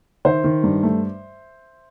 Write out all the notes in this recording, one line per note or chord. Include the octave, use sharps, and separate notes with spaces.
D#3 C5 E5
D#3
G2
A3